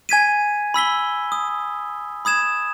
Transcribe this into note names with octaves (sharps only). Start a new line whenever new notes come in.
G#5 G#6 B6 D#7
B5 E6 B6 G7
D#6
B5 D#6 G#6 E7